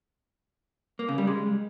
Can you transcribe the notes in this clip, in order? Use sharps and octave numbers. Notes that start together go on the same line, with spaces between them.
A#3
C#3
G3
G#3